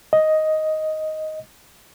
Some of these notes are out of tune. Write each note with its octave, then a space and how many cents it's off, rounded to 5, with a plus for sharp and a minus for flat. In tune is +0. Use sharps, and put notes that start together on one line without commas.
D#5 +5